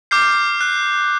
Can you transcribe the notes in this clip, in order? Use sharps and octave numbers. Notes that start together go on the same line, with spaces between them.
D6 F6 G6 C7
F#6